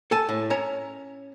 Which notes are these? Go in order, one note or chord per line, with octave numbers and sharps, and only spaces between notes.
A4 G#5 A5
A2
C#4 C#5 A#5